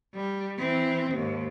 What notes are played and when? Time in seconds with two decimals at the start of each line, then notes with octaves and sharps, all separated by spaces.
0.15 G3
0.58 E3 C4
1.12 D#2 G#2